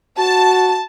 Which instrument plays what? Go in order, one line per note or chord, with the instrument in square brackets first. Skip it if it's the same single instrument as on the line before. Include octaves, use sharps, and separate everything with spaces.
[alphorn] F#4 [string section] A5